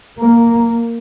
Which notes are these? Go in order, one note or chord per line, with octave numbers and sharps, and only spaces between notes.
A#3